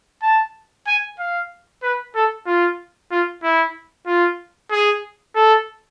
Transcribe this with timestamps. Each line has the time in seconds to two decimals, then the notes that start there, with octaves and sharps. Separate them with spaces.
0.22 A5
0.87 G#5
1.19 F5
1.83 B4
2.15 A4
2.47 F4
3.11 F4
3.43 E4
4.07 F4
4.71 G#4
5.35 A4